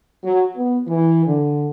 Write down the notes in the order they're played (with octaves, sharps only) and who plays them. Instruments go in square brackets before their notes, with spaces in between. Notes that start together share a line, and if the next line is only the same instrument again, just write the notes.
[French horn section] F#3
B3
E3
D3